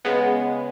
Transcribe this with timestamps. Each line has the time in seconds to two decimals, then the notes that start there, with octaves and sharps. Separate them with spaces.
0.05 C#3 G#3 B3